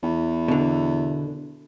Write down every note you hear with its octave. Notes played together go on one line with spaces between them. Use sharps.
E2
B2 D3